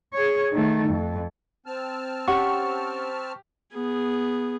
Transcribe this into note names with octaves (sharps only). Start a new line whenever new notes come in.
G#4 C#5
D#3 A3
F2
C4 A5 F6
C#4 G4 F#5 C#6
B3 G#4